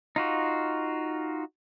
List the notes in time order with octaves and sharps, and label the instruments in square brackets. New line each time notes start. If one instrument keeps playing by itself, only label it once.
[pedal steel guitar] D#4 F4 F#4